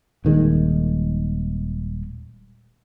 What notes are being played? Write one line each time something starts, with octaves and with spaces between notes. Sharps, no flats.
D#1 D#3 G#3